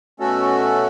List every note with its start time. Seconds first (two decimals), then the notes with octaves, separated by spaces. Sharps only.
0.20 B2 A3 C#4 F#4 A4